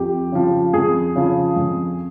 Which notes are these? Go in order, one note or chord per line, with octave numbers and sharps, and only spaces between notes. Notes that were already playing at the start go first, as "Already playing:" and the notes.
Already playing: F2 G4
C#3 F3
F2 G#4
C#3 F3
F2